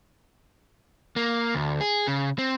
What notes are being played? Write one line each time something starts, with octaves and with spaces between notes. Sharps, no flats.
A#3
D2
G#4
C#3
C4